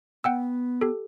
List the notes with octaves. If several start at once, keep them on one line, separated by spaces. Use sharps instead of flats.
B3 F#5 G5 E6
G4 A4